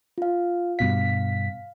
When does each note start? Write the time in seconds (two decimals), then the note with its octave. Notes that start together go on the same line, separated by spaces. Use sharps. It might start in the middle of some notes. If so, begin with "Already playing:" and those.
0.18 F4 F5
0.79 G2 B2 F5 B6